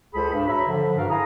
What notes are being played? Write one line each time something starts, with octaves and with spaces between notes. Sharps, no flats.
C#2 G#4 A4 C5 B5
G2
F#4 C#5 E5 A#5 B5
D3 F3
G2 F#4 A4 A#4 F5
E4 G#4 F5 G#5 A#5 D#6